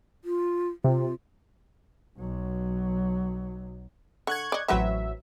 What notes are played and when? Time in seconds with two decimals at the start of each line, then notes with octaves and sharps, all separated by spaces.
0.24 F4
0.84 C3 F4
2.18 B1 F#3
4.27 D3 C#6 F#6 G#6
4.52 D5 D#5
4.68 A1 F#3 C4 F#4 B4 E5